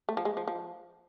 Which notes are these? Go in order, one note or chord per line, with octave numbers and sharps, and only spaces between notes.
A3
F3
G#3
F3
F3